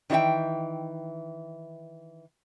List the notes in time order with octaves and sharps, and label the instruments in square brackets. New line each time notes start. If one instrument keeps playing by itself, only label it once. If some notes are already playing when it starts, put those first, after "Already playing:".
[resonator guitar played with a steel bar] D#3 E3 G#4 E5 G5